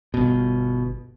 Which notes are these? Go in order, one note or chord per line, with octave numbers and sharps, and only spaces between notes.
G1 B2